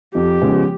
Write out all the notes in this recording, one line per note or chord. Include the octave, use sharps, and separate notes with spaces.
F2 G4
C#3 F3 G#3 B3